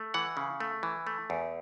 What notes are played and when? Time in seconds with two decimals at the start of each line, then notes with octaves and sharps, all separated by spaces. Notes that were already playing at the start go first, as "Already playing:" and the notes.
Already playing: A3
0.14 E3 F#5
0.37 C#3
0.60 A3
0.83 E3
1.07 A3
1.30 E2